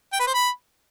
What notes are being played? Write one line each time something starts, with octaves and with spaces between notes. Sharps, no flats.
G5
B4
C5
B5